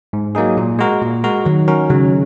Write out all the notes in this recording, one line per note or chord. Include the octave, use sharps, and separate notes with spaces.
G#2
F#3 A#3 D#4 G#4
A#2
G#3 F#4 A#4
A#2
G#3 F#4 A#4
D#3 F#3
C#4 F#4 A#4
C#3 F#3